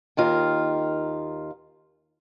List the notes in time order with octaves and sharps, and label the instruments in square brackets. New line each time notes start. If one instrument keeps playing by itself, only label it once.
[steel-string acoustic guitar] D#2 D#3 F4 A#4